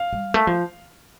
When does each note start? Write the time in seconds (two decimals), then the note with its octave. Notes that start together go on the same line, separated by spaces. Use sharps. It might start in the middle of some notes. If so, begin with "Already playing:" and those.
Already playing: F5
0.13 G3
0.34 A3
0.47 F3